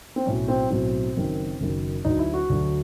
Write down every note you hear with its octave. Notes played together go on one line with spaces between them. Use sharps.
C4
B1 A2 F#3 C#4
C4
B1 A2 F#3 C4
F#1 F#2 D#3 F#3
F#1 F#2 D#3 F#3
D2 D3 F#3 D#4
E4
F#4
D2 D3 F#3